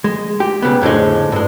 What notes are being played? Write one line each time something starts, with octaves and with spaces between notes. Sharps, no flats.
G#3
G4
B1 C#3 B3
F2 A2 D3 G#3
G2 G#3